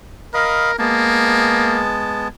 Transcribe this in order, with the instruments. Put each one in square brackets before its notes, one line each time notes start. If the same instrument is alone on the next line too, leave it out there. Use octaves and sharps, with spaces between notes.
[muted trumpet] A#4 [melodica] D#5 F5 B5
[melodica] G#3 B3 A5 [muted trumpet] A#3